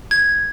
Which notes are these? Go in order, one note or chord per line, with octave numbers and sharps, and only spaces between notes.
G#6